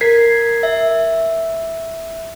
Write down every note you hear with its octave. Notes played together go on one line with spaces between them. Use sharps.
A#4 G#6 B6 C7
E5